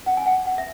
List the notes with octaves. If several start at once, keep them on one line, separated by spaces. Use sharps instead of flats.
F#5
G#5
F#5
F#5
E5